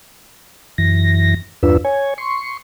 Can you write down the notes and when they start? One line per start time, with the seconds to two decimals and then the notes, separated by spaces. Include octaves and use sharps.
0.78 F#2 E3 A#6
1.63 E2 G2 D4 F4 B4 E6
1.85 C#5 G#5
2.18 C6 C#6